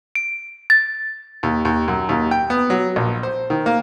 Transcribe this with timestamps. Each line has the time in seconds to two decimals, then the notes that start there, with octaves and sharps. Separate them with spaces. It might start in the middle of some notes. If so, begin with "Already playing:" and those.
0.15 D7
0.70 A6
1.43 D#2
1.65 D#2
1.88 F#2
2.09 D#2
2.31 G5
2.50 B3
2.70 F#3
2.96 A#1
3.23 C5
3.50 D#3
3.66 A#3